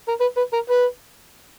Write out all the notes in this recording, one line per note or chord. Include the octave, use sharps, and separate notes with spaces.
A#4
B4
B4
A#4
B4